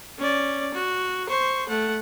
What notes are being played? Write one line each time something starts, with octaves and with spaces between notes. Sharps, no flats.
C#4 D5
F#4
C5 C#6
A3 F#5